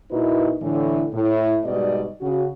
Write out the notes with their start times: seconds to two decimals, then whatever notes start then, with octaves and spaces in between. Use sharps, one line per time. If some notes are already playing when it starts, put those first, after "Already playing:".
0.11 A#2 D#4 E4 F#4 B4 D#5
0.61 A2 D3 E3
1.13 A2
1.64 G#2 B2 G3 D5 D#5
2.21 C#3 F#4